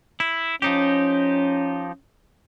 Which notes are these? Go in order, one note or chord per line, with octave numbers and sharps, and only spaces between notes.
E4
F3 C#4 D#4 G4